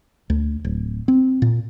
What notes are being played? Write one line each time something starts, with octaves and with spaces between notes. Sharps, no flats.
D2
D1
C4
A#2